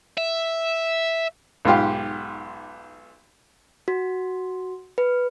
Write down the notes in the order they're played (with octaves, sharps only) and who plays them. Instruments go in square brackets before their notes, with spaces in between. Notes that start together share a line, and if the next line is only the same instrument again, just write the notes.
[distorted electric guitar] E5
[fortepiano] B1 G#2 F4 G4
[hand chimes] F#4
B4